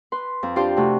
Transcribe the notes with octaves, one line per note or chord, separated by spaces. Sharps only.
B4 C6
F2
D4 F4 G4 C5
C3 A3 F#4